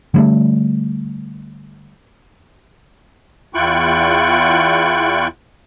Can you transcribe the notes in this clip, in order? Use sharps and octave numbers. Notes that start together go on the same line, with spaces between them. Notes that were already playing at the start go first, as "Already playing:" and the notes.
D3 G3 A3
E2 E4 F4 G5 C#6 F#6